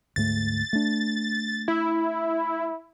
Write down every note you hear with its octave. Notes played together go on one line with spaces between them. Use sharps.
D2 G#2 A3 A6
A3 D4
E4